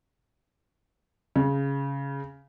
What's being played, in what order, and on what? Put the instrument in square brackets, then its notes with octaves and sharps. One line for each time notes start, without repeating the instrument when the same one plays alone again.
[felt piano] C#3